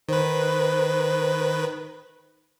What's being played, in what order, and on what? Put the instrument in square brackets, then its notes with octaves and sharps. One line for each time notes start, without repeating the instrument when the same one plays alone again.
[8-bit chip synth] D#3 B4 [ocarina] C5